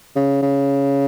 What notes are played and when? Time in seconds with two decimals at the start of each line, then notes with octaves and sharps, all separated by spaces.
0.16 C#3
0.42 C#3